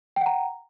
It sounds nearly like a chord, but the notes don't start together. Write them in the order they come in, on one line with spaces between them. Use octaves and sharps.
G5 F#5 A#5